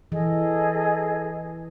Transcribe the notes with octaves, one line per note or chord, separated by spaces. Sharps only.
E3 G#4 A4 D#5